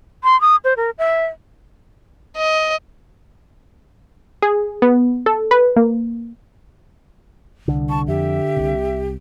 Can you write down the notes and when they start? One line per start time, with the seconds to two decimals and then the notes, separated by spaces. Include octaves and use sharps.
0.24 C6
0.41 D#6
0.64 C5
0.77 A#4
0.98 E5
2.36 D#5
4.42 G#4
4.82 B3
5.26 A4
5.51 B4
5.76 A#3
7.68 C2 D3
7.89 A5 C#6
8.08 F2 G4 E5
8.57 C2 C3